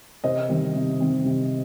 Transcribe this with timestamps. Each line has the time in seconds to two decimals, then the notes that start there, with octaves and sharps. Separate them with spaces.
0.24 C3 C5 D#5
0.49 D#3 G3 C4
0.75 C3
1.00 D#3 G3 C4
1.25 C3